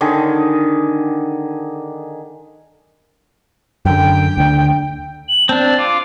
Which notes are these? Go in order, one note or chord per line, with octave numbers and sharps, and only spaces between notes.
D3 D#3 G#4
F#2 D3 G5
D2 D3
F#7
C4 D4 A5
F4 D6